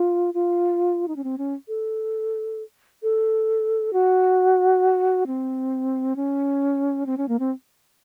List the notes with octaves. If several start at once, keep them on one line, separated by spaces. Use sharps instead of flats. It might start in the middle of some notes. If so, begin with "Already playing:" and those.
Already playing: F4
F4
D#4
C#4
C4
C#4
A4
A4
F#4
C4
C#4
C4
C#4
A#3
C4